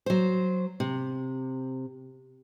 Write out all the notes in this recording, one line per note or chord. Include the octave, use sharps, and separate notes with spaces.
F#3 C5
C3